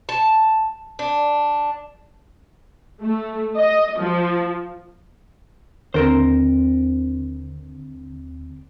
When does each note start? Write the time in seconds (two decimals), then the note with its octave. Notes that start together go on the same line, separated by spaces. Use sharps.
0.09 A5
0.99 D4
3.02 A3
3.57 D#5
4.00 F3
5.94 D#2 D3 C4 A#4 C5